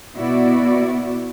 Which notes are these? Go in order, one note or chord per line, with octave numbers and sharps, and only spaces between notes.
B2 B3 E4 F#4 D5